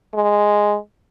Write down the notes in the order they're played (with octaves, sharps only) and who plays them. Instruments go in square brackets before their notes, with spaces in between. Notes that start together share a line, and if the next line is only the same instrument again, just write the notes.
[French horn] G#3